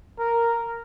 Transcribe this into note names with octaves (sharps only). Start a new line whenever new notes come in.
A#4